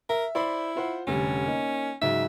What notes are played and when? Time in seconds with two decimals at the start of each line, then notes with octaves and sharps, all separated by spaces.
0.09 A#4 E5
0.35 E4 C5 D5 B5
0.76 F4 C5 F#5
1.07 F1 D3 G3 C#4
1.45 A#3 D#4
2.01 G#2 C#3 F#3 E5